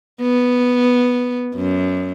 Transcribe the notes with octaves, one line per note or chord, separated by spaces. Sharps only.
B3
F#2